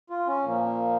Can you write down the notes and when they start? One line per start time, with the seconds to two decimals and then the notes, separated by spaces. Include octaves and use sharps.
0.10 F4
0.27 C#4
0.45 A#2 F3 A#3